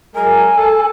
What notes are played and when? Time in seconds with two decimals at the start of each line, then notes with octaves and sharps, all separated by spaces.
0.15 F#3 G#3 A#4 G#5
0.57 A4